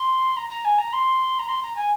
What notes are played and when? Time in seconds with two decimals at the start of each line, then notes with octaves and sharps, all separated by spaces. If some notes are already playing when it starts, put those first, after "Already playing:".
Already playing: C6
0.37 A#5
0.50 A#5
0.65 G#5
0.78 A#5
0.93 C6
1.39 A#5
1.48 C6
1.63 A#5
1.76 G#5